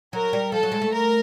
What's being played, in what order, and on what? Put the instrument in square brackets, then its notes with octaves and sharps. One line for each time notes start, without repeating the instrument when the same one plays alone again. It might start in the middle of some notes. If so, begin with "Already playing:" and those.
[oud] F#3 [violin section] A#4
[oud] G3
[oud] F3 [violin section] A4
[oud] F#3
G#3
A3
[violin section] A#4